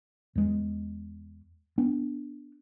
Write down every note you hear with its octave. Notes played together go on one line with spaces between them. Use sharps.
E2 G#3
B3 D4